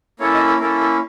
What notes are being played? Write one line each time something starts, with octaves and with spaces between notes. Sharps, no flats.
A#3 C#4 E4 A4 C#5
D#5
A4
A#3 C#4 E4 A4 A#4
A4